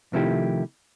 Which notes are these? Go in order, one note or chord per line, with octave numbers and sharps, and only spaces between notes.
C3 D#3 F3 A3 E4 G4